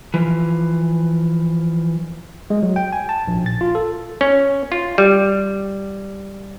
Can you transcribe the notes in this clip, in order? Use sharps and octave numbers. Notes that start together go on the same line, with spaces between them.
E3 F3
G#3
F#3
G5
G#5
A5
A#1
A6
F4
A4
C#4
F4
G3